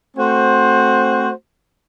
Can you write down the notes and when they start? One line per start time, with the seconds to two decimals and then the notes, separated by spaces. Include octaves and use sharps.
0.17 A3 C4 F#4 C5